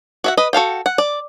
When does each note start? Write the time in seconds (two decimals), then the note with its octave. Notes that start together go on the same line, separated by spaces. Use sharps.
0.24 F#4 E5 F#5
0.37 B4 D#5
0.53 F#4 A4 F5 G5
0.86 F#5
0.98 D5